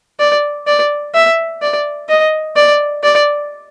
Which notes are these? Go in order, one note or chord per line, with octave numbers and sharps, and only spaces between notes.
D5
D5
E5
D5
D#5
D5
D5